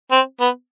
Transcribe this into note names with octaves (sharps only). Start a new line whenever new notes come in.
C4
B3